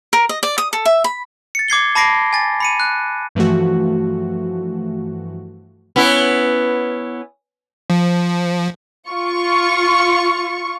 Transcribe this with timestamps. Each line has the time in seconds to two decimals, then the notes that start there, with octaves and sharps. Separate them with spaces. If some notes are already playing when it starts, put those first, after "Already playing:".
0.13 A#4
0.29 D#5
0.43 D5
0.58 D#6
0.73 A4
0.85 E5
1.04 B5
1.55 A6 C#7
1.68 D6 G#6 C7 G7
1.95 A5 B5 D6 A#6 C7 D7
2.33 G#5 A6
2.60 B5 C#7 D#7
2.80 F#6
3.35 G2 E3 F3 A3 F#4
5.96 B3 C#4 E4
7.90 F3
9.10 F4 C#6